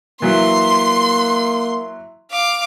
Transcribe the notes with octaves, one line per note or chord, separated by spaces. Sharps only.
E3 F#3 A#3 E5 C6
F5 D6